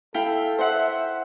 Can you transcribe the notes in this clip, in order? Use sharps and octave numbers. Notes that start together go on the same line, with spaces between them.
E4 A4 F5 G5
C5 E5 F#5